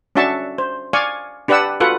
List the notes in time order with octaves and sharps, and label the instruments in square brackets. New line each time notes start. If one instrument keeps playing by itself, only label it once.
[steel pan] C#4 D4 F#4 E5 A5 C#6
C5
D5 F5 G#5 C#6
D4 G4 B4 D5 F#5 E6
F4 F#4 A4 B4 F#5